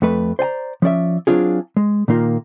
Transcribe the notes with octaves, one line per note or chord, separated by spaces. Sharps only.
F2 A3 B4
C5 D5 G#5 A#5
F3 C#4 D5 E5
F#3 C4 D4 F4 G#4
G#3
A#2 D#3 A#3 F4